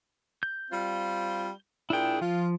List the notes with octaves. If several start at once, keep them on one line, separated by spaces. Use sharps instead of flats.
G6
G3 C4 F4
A#2 D4 E4 G#4 G5
F3 F4